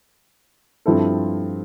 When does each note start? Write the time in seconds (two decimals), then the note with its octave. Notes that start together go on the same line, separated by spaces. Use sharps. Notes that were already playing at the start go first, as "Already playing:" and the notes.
0.86 G2 F3 C4 E4 A4